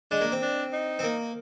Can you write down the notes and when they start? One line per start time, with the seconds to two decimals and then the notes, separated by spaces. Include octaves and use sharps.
0.11 G#3 D4
0.21 A#3
0.32 C4
0.42 D4
0.73 D#4
0.99 C4
1.03 A#3